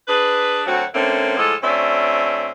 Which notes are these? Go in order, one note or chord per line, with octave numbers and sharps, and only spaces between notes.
D4 G#4 B4
D2 F#3 C4 F#4 F#5
D3 A3 A#3 C4 C#4
A2 F3 G#3 A4
D2 C4 C#4 D5 E5